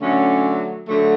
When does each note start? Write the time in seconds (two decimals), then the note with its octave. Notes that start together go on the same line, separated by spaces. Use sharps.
0.01 D3 F#3 A3 C#4
0.88 D3 F#3 A3